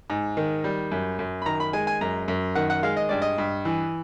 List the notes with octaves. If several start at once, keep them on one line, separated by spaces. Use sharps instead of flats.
G#2
D#3
G3
F#2
F#2
B5
D#3 A#5
B5
G#3 G#5
G#5
F#2 A#5
F#2
D#3 F#5
F#5
G#3 F5
D#5
G2 D5
D#5
G2
E3